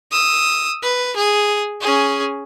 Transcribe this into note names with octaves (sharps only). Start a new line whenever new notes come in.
D#6 E6
B4
G#4
C#4 G#4